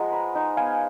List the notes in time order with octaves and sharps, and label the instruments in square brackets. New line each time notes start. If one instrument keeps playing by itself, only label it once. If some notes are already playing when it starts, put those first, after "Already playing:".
Already playing: [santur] F3 G#3 G#4 [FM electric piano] F#5 A#5
[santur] B4
D#4
[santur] B3 [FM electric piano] F5 G#5